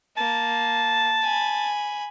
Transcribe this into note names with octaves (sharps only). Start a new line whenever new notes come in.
A#3 A5
G#5 B5